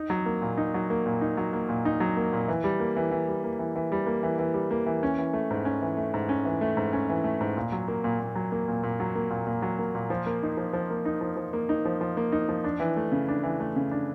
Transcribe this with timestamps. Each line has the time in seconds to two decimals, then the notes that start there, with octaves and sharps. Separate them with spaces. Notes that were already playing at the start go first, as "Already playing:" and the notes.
Already playing: D#4
0.10 F#3
0.26 A#3
0.42 A#2
0.57 D#4
0.74 F#3
0.90 A#3
1.06 A#2
1.21 D#4
1.37 F#3
1.53 A#3
1.69 A#2
1.85 D#4
2.00 F#3
2.17 A#3
2.33 A#2
2.48 E3
2.64 G3
2.80 A#3
2.96 E3
3.11 E3
3.28 G3
3.44 A#3
3.59 E3
3.76 E3
3.92 G3
4.06 A#3
4.23 E3
4.39 E3
4.54 G3
4.71 A#3
4.86 E3
5.03 C#4
5.19 E3
5.33 A3
5.51 G#2
5.65 C#4
5.82 E3
5.97 A3
6.14 G#2
6.29 C#4
6.45 E3
6.61 A3
6.77 G#2
6.93 C#4
7.09 E3
7.24 A3
7.41 G#2
7.57 A#2
7.72 F#3
7.88 A#3
8.04 A#2
8.20 A#2
8.36 F#3
8.52 A#3
8.68 A#2
8.83 A#2
9.00 F#3
9.15 A#3
9.30 A#2
9.47 A#2
9.62 F#3
9.79 A#3
9.95 A#2
10.10 F3
10.26 A#3
10.43 D#4
10.57 F3
10.73 F3
10.90 A#3
11.05 D#4
11.21 F3
11.37 F3
11.53 A#3
11.69 D#4
11.85 F3
12.01 F3
12.17 A#3
12.32 D#4
12.49 F3
12.64 D4
12.80 E3
12.96 A3
13.12 C#3
13.28 D4
13.43 E3
13.60 A3
13.76 C#3
13.91 D4